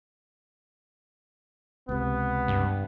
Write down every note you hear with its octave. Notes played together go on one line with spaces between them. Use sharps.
C#2 C3 B3
G2